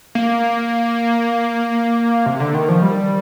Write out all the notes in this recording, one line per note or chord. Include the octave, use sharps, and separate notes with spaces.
A#3
C3
D3
D#3
F3
G3